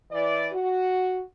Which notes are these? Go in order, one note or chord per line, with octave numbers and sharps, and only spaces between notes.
E3 D5
F#4